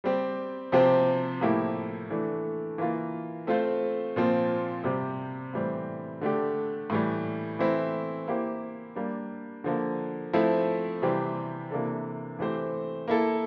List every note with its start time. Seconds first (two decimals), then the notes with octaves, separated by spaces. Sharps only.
0.04 G3 C4 G4
0.72 C3 F3 C4 G4 C5
1.41 A2 F3 A#3 E4 G4
2.10 E3 A3 D4 A4
2.78 E3 A#3 F4
3.47 A3 C4 F4 C5
4.16 A#2 F3 C4 F4
4.84 C3 G3 C4 G4
5.54 A2 E3 G3 C4
6.21 D3 A3 D4 G4
6.90 A2 E3 G3
7.59 E3 A3 C4 E4
8.28 A#3 E4 G4 C5
8.95 G3 A#3 D4
9.64 D3 F3 A#3
10.33 F3 A3 C4 E4
11.02 C3 E3 G3 C4 G4
11.71 C3 E3 A#3 D4 A4
12.39 E3 A3 C4 G4 C5
13.08 A#3 E4 A4